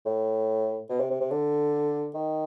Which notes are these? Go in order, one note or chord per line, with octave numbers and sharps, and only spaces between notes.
A2
B2
C3
C3
C3
D3
D#3